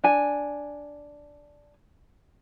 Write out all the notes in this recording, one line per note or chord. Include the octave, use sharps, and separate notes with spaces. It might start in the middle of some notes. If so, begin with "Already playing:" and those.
D4 G#5